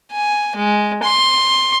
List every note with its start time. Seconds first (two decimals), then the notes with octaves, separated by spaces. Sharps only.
0.11 G#5
0.56 G#3
1.03 C6